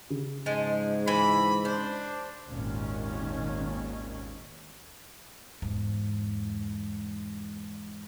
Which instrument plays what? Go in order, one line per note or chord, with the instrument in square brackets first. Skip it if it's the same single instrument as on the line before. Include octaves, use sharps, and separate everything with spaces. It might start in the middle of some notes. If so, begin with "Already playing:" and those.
[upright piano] C#3
[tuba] G#2 [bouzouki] F3 G#3
[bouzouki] E3 [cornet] B5
[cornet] D4 [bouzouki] C5
[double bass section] G#1 D#2 A#2 D#3 C#4
[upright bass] E2 G#2